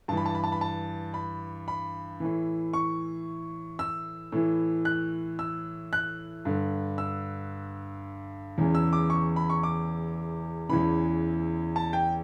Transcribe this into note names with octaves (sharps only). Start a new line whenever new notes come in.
G2 E3 A5
B5
A5
B5
A5
B5
A5
B5
B5
A2 E3
C#6
E6
A2 E3
F#6
E6
F#6
G2 D3
E6
E2 C#3 E3
E6
D6
C#6
B5
C#6
D6
E2 C#3 E3 B5
A5
G5